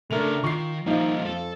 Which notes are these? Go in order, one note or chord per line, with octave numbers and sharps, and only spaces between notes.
C#3 A3 D4 A#4 E5 F7
D#3 F4 C#6 C7
F3 G3 A#3 D#4 F4
F2 A4